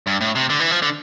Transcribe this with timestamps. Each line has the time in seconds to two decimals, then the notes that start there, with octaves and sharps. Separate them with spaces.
0.07 G2
0.21 A2
0.35 C3
0.50 D3
0.60 E3
0.71 F3
0.82 D3